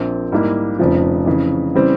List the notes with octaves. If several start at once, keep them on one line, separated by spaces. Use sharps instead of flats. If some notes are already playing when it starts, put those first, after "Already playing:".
Already playing: A#1 A#2 F3 C4
G#2 G3 A#3 E4
F1 F2 C#3 F3
F2 C#3 E3
C#3 E3 G3 C4